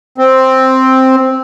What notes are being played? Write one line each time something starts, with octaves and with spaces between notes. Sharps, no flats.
C4